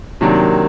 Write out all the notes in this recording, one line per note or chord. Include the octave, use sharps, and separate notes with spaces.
C3 D#3 F#3 A#3 D4